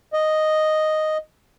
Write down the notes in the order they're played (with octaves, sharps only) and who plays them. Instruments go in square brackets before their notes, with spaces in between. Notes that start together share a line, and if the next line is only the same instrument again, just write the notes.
[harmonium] D#5